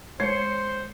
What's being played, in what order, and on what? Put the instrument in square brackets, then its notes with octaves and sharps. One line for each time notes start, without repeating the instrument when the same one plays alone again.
[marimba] G#3 [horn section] C5 [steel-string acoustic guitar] C#5 [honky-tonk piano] C7 C#7